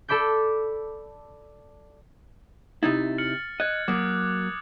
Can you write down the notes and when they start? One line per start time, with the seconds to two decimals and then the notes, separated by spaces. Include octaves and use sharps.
0.08 A4 D5 B5 D6 G6
2.83 C3 D#4 E4 A6
3.18 F6 C#7 F#7
3.60 D#5 F#6 G#6
3.88 F#3 A#3 D6 D#6